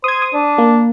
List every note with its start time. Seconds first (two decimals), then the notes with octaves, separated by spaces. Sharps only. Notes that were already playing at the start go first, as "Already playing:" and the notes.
0.04 C5 D#6 G#6
0.22 D#6
0.33 D4
0.58 A#3